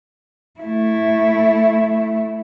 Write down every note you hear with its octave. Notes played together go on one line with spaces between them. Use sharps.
A3 E4